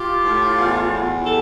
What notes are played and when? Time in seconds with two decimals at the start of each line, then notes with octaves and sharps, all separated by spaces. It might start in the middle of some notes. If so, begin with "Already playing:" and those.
Already playing: F4 G4
0.25 A2
0.58 E2
0.92 E2
1.24 G4 A4